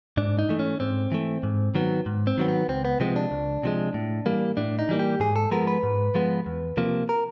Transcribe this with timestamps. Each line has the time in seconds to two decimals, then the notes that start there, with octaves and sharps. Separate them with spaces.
0.17 G#2 D4
0.39 D#4
0.49 E3 A3
0.59 C#4
0.80 G#2 C4
1.12 E3 A3
1.43 G#2
1.75 D#3 F#3 B3
2.06 G#2
2.27 C4
2.38 D#3 F#3 B3
2.48 B3
2.69 C#2 C4
2.85 B3
3.00 C3 F3 G#3 C4
3.16 D4
3.31 C#2
3.63 C3 F3 G#3
3.94 A2
4.26 E3 G3 A#3
4.57 A2 D4
4.79 D#4
4.89 E3 G3 A#3
4.99 G4
5.20 G#2 G#4
5.36 A4
5.51 F3 G#3 B3 A#4
5.67 B4
5.83 G#2
6.15 F3 G#3 B3
6.46 E2
6.77 C3 F3 A#3
7.09 A#4